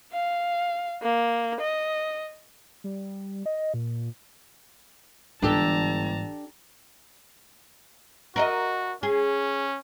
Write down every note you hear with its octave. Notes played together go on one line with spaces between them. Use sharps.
F5
A#3
D#5
G3
D#5
A#2
G1 G#2 E3 D4 G4 A4 A5 A#5
F#4 A#4 D5 D#5
C#4 G#4